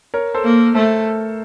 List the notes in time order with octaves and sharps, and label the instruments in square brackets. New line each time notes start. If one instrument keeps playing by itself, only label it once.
[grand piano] A#4 C#5
A4 C5
[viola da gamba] A#3
[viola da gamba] A3 [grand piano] A4 C5